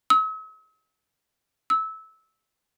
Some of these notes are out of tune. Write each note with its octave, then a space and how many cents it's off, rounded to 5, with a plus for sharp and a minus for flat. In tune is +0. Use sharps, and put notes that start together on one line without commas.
E6 -45
E6 -20